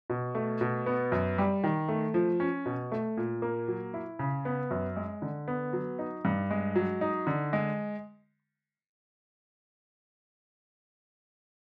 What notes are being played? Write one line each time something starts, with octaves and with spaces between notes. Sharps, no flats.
B2
A3
B2
B3
F#2
G3
D#3
A3
F3
C#4
B2
A3
A#2
A#3
F#3
E4
C#3
B3
F#2
G#3
D3
B3
F#3
D#4
G2
G#3
F#3
D#4
D3
G#3